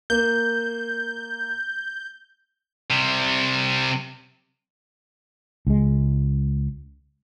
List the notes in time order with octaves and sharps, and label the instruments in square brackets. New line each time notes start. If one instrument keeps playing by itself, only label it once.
[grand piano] A#3 [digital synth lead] G6
[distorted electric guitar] C3 G3
[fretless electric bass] C#2 G#3